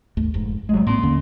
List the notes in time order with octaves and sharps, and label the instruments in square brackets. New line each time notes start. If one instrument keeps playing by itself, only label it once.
[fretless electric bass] G#1 D#2 A3
F1 G#2
[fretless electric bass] A1 [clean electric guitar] F#3 G#3
[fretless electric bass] A2 C4 [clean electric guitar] A#3 C6
[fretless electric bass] D#2 D3 C#4